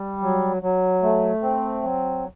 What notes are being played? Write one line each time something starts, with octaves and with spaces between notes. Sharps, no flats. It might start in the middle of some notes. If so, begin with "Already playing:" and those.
Already playing: G3
F#3
F#3
A3
C4
F#3